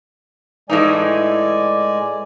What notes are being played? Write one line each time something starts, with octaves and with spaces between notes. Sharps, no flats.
A2 E3 G#3 D#4 D5 G#5